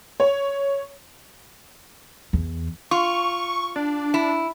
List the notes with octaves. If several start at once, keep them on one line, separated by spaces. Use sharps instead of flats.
C#5
E2
F4 C#6
D4
E4